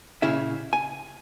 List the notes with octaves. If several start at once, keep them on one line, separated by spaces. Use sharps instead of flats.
A#2 C#3 C#4 E4 G#4 E5
G#5